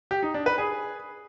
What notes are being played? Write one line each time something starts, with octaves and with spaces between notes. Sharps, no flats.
G4
D#4
D4
B4
G#4